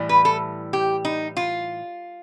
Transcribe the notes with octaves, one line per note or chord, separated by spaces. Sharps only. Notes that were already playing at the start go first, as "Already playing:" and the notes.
Already playing: A2 E3 G3
B4
A4
G4
D#4
F4